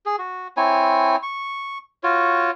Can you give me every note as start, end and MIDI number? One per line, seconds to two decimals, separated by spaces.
0.06 0.16 68
0.18 0.48 66
0.57 1.16 60
0.57 1.16 64
0.57 1.16 73
0.57 1.16 80
1.23 1.78 85
2.03 2.51 65
2.03 2.51 66
2.03 2.51 73